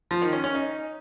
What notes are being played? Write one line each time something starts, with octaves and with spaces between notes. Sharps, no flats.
F3
D#3
C#4
C#4
D#4